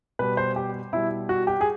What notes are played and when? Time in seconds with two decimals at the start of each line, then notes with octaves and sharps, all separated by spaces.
0.19 B2 G3 B4
0.37 C5
0.56 G4
0.93 B2 G3 E4
1.29 F#4
1.47 G4
1.61 G#4